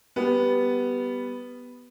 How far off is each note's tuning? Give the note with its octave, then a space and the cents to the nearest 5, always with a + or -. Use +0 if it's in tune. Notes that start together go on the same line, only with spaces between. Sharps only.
G3 +0 B3 +0